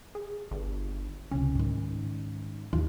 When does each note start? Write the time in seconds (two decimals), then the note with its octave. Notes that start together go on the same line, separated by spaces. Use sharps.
0.15 G#4
0.51 G1
1.31 C#2 C3 C#4
1.55 G#2 D#3
2.73 D#2 F4